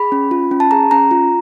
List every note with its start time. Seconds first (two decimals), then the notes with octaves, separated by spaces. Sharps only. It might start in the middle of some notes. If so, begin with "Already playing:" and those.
Already playing: G#4 B5
0.12 C#4
0.31 F4
0.51 C#4
0.60 A5
0.71 G#4 A#5
0.91 C#4 A#5
1.11 F4